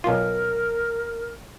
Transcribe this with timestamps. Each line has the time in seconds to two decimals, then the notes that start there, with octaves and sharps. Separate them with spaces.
0.04 B1 F4 A#4